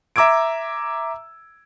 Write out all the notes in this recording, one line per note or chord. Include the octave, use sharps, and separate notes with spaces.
E5 A#5 D6 E6 G#6 D7